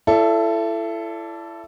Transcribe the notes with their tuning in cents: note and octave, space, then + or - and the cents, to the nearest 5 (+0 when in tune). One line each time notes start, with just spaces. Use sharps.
E4 +30 A4 +0 D5 -20